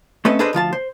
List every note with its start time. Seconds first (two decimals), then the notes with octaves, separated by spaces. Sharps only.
0.25 A3 C4 C#4 A4 B4 D#5
0.39 D4 G#4 A4 B4 C5 D#5
0.53 D2 F3 F4 A5
0.73 C5